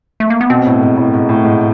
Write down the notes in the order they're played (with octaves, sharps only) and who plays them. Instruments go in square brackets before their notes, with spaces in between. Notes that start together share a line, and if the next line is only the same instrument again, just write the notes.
[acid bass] A3
A#3
B3
[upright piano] B2 [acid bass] C4
[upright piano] A2
G#2
A2
G#2
A2
G#2